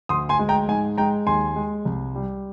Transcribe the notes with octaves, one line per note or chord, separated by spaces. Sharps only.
D2 C6 D#6
G#5 C6
G#3
G5 A#5
G#2 G#5
G#3 G5 A#5
D#2 G#5 C6
G#3
C2
G3